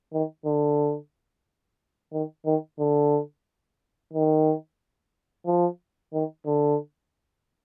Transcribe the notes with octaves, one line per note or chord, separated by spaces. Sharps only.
D#3
D3
D#3
D#3
D3
D#3
F3
D#3
D3